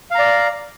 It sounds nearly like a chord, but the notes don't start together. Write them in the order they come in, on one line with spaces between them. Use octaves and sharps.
F5 A#5 D5